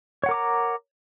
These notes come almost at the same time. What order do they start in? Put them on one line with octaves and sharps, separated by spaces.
C#5 F#5 A#4 D6 A#5